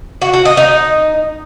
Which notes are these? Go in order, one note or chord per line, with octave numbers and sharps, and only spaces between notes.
F#4
F#4
D#5
D#4